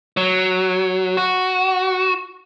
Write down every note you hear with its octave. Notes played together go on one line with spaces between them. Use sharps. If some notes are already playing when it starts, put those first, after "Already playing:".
F#3
F#4